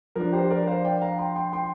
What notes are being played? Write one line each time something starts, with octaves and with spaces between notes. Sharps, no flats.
F3 D4 A#4
G4 C5
A#4 D5
C5 F5
D5 G5
F5 A#5
G5 C6
G5 C6
G5 C6